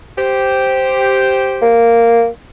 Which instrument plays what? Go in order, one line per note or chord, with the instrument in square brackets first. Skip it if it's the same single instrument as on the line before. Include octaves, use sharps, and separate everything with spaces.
[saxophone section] G4 C5
[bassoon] A#3